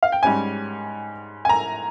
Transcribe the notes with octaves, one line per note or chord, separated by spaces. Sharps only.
F5
G5
G#2 G3 C#4 G#5
G#5
A#5